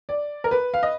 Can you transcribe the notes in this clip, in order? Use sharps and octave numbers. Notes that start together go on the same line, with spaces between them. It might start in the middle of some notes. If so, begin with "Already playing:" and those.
D5
A#4
B4
F5
D#5